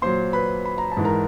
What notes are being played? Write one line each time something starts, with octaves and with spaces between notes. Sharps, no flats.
A#2 F#3 C5 C6
B4 B5
B5
A#5
A5
G#2 E3
A#4 A#5